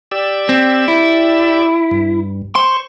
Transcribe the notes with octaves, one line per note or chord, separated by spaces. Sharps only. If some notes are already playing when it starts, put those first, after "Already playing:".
G4 D5 E6
C4
E4
G2
C5 C6 C#6